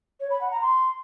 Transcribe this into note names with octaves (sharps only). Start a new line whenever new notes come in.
C#5
B5
F#5
A#5
C6